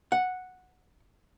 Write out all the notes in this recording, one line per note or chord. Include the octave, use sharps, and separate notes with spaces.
F#5